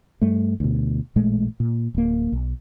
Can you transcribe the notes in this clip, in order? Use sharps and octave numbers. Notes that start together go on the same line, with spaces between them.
G2 G3 A3
D2 B2
A1 A#2 G#3 A3
A#2
D1 A#3
B1